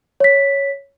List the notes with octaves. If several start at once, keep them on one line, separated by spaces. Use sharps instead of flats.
C#5 B6